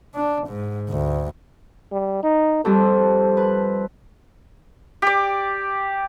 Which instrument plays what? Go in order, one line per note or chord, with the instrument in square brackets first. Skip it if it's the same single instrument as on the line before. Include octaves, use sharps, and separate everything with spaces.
[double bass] D4
G#2
D2
[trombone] G3
D#4
[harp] F2 G3 C4 [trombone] A4
[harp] B4
[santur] G4 D5